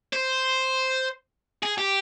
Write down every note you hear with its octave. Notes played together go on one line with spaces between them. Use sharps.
C5
G#4
G4